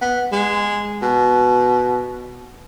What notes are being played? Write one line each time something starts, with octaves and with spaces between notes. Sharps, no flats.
B3
G#3
B2